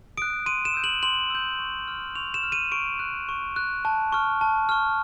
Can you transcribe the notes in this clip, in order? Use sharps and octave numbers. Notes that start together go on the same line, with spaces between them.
D#6 F#6 D7
C6 D#7
E7
E6 G6
F#7
C6 F#7
E6 G6
C#6
F6
C#6 F7
E7
F6
D#7
C#6 D7
F#6
C#6
F#6
A5
C#6 F6
A5
C#6 F6